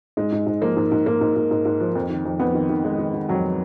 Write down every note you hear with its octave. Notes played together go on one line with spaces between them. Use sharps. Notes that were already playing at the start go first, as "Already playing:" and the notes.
G#2 G#3
G#2
G#2
F3 A#3
G#2
G#2
G#2 A#3
G#2
G#2
G#2
G#2
F3
F2
D#3
F2
F2 B3
D#3
D#3
D#3 G#3
D#3
D#3
F2 F#3